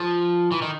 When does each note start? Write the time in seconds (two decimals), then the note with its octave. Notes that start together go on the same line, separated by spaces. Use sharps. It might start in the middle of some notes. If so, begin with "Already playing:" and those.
Already playing: F3
0.51 E3
0.62 D#3